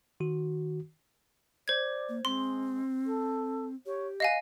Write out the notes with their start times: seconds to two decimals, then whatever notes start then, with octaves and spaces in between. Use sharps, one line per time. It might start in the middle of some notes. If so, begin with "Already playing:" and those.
0.20 D#3 F#4
1.68 C5 D5 G#6
2.09 A#3
2.25 G#3 C4 C6
3.05 A4
3.86 G4 C#5
4.20 D#5 F5 F#5 G#5